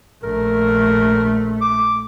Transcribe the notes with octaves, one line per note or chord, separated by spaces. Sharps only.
A#1 A3 A#4
D6